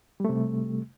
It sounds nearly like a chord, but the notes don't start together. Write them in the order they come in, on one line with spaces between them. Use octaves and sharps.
G3 A3 C3